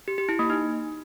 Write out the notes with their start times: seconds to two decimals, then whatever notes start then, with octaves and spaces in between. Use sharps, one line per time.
0.08 G4
0.18 G4
0.29 E4
0.39 A#3
0.50 D#4